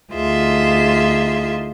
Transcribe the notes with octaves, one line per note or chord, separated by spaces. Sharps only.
D2 D#4 F4 G#4 E5 C6